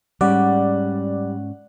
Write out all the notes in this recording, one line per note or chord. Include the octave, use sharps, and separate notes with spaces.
G#2 G3 C#4 D5 F#5